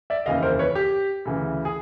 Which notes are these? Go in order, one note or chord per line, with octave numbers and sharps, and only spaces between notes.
D5 E5
F1 D#2 C#3 E3 D#5 F5
A#4 C5
B4 C#5
G4
D2 C#3 E3
G#4